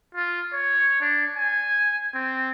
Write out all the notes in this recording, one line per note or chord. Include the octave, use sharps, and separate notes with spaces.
F4
C#5
D4
G#5
C4